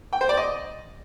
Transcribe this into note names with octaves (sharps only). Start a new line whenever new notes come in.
G5
C5
D5
D#5